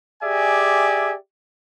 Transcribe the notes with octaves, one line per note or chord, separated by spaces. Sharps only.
G4 G#4 D5 E5 G#5